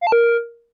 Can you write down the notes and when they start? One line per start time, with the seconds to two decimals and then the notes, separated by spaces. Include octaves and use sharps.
0.01 F5
0.07 A5
0.12 A#4